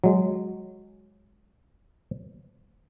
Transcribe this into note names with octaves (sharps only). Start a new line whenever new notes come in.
F#3 G#3